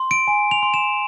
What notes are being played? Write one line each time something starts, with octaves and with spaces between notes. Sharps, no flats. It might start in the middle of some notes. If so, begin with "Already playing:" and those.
Already playing: C6
D7
G#5
F7
C6
E7